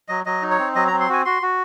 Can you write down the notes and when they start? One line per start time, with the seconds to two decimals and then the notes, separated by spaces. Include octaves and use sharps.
0.08 F#3 D#5
0.26 F#3 D#5
0.42 D#4
0.51 C#5
0.59 C4
0.75 F#3 D#5
0.87 A#5
0.92 C4
1.00 C6
1.09 F#4 G#5
1.25 F#4 C6
1.42 F#4